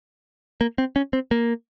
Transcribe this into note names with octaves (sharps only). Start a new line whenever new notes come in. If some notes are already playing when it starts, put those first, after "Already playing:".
A#3
C4
C#4
C4
A#3